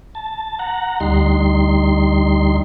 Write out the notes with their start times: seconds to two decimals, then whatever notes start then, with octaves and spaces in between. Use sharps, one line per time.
0.15 A5
0.59 F#5 A#5
1.00 D2 G3 D#4 C6